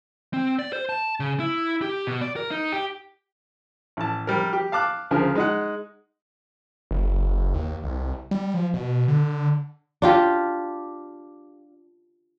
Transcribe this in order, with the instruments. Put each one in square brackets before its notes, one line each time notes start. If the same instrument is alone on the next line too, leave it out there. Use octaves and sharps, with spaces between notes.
[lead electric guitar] C4
D5
C5
A5
C#3
E4
G4
B2
D5
A#4
D#4
G4
[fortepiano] A1 A5
G3 A#4
G4
F5 A5 D6 F#6
D2 C#3 F3 A#4
G#3 D#4 F#5
[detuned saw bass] F#1
D#2
C2
G3
F3
B2
D3
[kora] D4 F4 G4